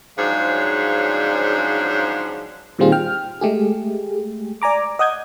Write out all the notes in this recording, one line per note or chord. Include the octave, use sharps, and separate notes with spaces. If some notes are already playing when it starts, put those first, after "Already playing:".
G#2 C#3 F3 F#3 D4
A#2 D#3 G3 C4 F4 G#4
G5 F6
G#3 A3 G4 G#4
D5 G#5 A#5 D6
D#5 F#5 D#6 G6 G#6